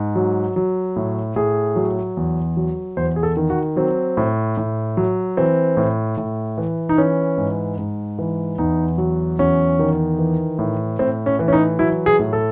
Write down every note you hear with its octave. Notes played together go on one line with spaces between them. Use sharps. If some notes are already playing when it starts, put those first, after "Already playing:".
Already playing: G#2
F#3
F#3
A2
A2 G#4
F#3
E2
F#3
E2 C5
G#4
A4
D#3
F#4
F#3 C4
A2
A2
F#3
E3 C4
A2
A2
E3
D#4
E3 C#4
G#2
G#2
E3
E2 D#4
F#3
E2 C#4
D#3
E3
A2
A2 C4
C#4
E3
C#4
D#4
F#3 E4
G#4
A2
A4